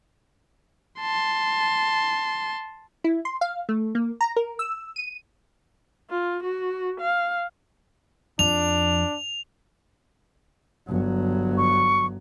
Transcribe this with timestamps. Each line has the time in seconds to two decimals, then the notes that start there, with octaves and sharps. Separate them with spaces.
1.01 A5 C6
3.04 E4
3.25 C6
3.41 F5
3.69 A3
3.95 A#3
4.21 A#5
4.36 A#4
4.59 E6
4.96 D#7
6.10 F4
6.43 F#4
7.00 F5
8.39 F2 D4 F7
10.88 G1 F#3
11.58 C#6